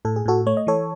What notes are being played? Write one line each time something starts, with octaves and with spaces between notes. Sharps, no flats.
A2 A4
G#4
A2 F#4 A4
A3 C#5
D#5
E3 A4 C#5